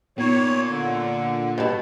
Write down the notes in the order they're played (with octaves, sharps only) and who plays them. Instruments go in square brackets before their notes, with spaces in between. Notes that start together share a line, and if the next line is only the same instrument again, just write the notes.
[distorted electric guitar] A#2 [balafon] B3 D#4 [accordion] C#5
[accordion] D3
[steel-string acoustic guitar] G2 B2